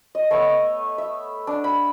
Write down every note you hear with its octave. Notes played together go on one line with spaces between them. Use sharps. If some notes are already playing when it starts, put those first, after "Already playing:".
D#5
A3 B3 C#5 C#6
E5
D4
B5